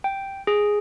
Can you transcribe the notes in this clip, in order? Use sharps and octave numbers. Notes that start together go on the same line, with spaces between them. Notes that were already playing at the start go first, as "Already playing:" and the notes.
G5
G#4